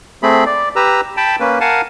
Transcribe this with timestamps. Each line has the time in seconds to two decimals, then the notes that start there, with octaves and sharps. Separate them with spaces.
0.23 A3 C4 G#4 B5
0.46 D5
0.76 G4 B4 A#5 E6
1.17 G5 A5 B5
1.40 A#3 C#4 B4
1.61 A#4 F5 F#5 G#5 A5